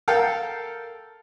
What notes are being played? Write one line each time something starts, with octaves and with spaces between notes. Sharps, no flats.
A4 A#4 F5 G5